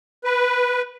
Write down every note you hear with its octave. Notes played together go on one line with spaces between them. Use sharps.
B4